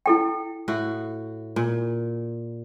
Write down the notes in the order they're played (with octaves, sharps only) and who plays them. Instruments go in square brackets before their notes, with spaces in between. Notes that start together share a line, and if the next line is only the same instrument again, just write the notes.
[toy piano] E4 A4 G5
[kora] A2 F#4
A#2